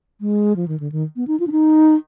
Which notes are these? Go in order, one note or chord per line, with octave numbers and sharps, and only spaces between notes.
G#3
F3
D#3
D3
D#3
B3
D#4
F4
D4
D#4